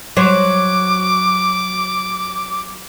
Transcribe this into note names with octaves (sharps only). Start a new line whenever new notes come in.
F#3 C5 D6